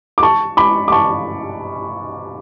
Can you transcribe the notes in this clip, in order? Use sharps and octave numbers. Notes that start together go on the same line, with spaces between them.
D6
A5 C#6
B5 D6
D6
A5 C#6